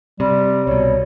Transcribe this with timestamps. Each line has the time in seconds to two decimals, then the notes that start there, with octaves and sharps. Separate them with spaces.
0.20 C3 G3
0.67 C2 B2 C#5